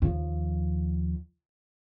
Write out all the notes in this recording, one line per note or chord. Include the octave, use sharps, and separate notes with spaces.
D#2 F3